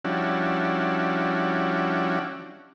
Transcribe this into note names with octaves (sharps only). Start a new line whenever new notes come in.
F3 G3 C#4 D4 E4 F#4